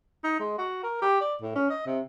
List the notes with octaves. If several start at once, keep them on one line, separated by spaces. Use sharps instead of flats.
D#4
G#3
F#4
A#4
G4
D5
A2
C#4
D#5
C3